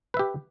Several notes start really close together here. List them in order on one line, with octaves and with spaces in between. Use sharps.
B4 E5 G4